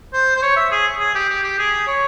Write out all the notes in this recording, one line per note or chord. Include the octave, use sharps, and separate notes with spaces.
C5
C5
C#5
E5
G#4
G#4
G4
G4
G4
G#4
C#5